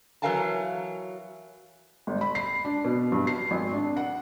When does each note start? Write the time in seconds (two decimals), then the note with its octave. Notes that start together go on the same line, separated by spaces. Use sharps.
0.22 E3 F#3 A#4 F5 G#5 A5
2.07 G1
2.21 B5
2.35 C7
2.65 D4
2.85 B2
3.12 G2
3.27 C7
3.51 G#1
3.73 D4
3.97 F#5